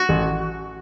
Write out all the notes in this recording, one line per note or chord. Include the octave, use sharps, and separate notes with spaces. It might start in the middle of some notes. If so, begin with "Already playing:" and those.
Already playing: F#4
A1